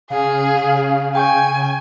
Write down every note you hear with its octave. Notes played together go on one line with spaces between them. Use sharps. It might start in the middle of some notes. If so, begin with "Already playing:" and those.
C#3 G#4 F5
G5 G#5 C#6 G6